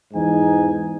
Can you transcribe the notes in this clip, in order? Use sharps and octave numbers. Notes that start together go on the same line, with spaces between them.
E2 G#2 D#4 G#5